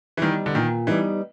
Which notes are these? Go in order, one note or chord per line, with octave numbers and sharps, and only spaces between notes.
E3
D#3 G3 B3 D#4
D3
A#2 D#3
E3 G3 B3 D#4